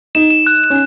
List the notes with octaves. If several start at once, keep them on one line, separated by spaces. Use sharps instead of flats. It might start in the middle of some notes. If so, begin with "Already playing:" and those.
D#4 E7
E7
F#6
E7
C#4